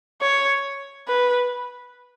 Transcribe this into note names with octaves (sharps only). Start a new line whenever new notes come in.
C#5
B4